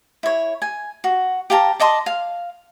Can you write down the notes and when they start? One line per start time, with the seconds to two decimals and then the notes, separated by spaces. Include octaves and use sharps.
0.23 E4 C#5
0.62 G#5
1.04 F#4
1.50 G4 F5 A5 A#5
1.80 D5 D#5 A5 C6
2.06 F5